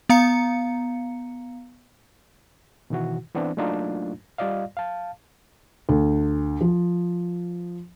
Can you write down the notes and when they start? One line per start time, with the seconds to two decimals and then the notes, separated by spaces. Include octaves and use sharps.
0.09 B3 F5 A#5 C#7
2.90 B2 D#3 E3 F#4
3.35 E3 B3 C4 D4
3.57 F#3 A3 A#3 D4 D#4 F4
4.38 G3 F4 D5 D#5 F5
4.77 F5 A5
5.89 D2
6.61 F3